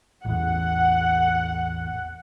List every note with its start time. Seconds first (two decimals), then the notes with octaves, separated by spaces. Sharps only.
0.25 A1 E2 F#5